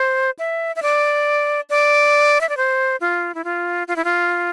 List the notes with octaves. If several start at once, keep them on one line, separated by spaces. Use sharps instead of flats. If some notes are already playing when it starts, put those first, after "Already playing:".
Already playing: C5
E5
E5
D5
D5
E5
D5
C5
F4
E4
F4
F4
E4
F4